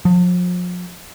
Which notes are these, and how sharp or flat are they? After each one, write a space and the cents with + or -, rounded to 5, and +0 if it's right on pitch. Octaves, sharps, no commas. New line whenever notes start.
F3 +40